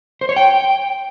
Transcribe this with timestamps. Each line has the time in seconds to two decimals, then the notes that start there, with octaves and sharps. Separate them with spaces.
0.21 C5
0.29 C#5
0.36 G5